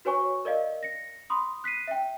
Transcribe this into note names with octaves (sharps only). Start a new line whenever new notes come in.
F#4 B4 C#5 G#5 C#6
A#4 D5 D#5 F5
A#6 C#7
B5 C6 D#6
F#6 B6 C7 D#7
E5 G5